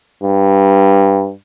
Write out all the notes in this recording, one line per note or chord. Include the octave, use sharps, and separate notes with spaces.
G2